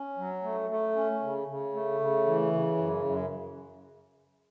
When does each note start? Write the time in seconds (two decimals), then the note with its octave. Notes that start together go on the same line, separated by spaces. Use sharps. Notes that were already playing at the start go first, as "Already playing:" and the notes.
Already playing: C#4
0.18 F#3
0.43 A3
0.70 A3
0.96 C#4
1.22 C#3
1.47 C#3
1.74 A3
2.00 C#3
2.26 E3
2.52 C#3
2.77 F#2
3.04 F#2